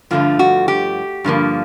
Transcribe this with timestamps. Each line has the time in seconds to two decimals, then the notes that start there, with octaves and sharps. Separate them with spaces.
0.11 G2 D3 F3 A3 F4
0.39 F#4
0.68 G4
1.24 G2 D3 F3 A#3